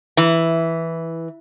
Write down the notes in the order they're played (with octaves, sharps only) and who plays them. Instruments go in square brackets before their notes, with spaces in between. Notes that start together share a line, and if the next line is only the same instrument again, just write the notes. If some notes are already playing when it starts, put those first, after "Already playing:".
[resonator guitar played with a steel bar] E3